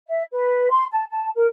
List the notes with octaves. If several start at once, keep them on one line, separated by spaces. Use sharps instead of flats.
E5
B4
C6
A5
A5
A#4